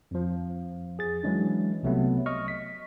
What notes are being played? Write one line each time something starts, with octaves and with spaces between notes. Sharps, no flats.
F2 F3
G#4 A6
E3 F#3 G#3 C#4 D4
C2 C3 F#3 A3 B3
D#5 C#6 F6
B6